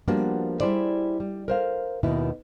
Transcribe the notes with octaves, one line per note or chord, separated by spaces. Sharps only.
F3 G3 A#3 B3 D4 F#4
G3 E4 G#4 C5 D5
G3
A#4 C5 F5
D#2 B2 D#3 E4 B4